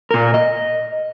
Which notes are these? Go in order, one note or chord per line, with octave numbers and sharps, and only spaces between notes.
A#2 A#4
D#5